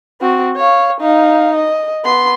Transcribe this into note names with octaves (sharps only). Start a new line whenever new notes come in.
C4 F#4
C#5 F5
D#4 F5
D#5
B3 C6